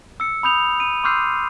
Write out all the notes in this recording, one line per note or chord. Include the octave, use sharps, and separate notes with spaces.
E6 C#7
B5 D#6 G6 F7
D#7
C6 D6 E6 F6 G6 C7